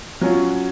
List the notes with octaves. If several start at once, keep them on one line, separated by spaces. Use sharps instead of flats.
F#3 C#4 F4